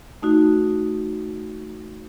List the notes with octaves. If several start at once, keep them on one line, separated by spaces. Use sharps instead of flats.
A3 D#4 F#4